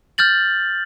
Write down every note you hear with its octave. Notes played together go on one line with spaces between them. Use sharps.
F6 G6 A6 F#7